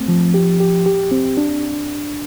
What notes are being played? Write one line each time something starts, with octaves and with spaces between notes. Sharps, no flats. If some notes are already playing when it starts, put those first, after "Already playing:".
Already playing: A3 C4
F3
G4
G4
G4
C4
D4